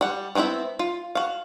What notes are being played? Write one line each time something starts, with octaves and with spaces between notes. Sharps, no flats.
G3 F#5
E3 B3 C4 E4 E5
F4
F#4 F5